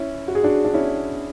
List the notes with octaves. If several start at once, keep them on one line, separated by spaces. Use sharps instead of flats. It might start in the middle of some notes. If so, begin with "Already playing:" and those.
Already playing: C#4 E4
F#4
G#4
D4 F#4
D4
C#4 E4